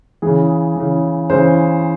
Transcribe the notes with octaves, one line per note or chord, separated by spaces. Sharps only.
C#3 E3 G#4
C#3 E3
C#3 E3 C5